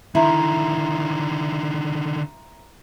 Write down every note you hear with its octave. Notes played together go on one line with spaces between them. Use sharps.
D3 D#3 E4 E5 A#5 C6